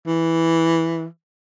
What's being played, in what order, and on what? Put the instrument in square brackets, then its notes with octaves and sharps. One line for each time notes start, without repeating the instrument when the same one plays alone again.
[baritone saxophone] E3